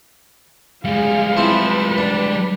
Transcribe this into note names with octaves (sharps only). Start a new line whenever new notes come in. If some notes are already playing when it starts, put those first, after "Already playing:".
G3 G#3 G#4 F5
F3 C4 E4 B4
D4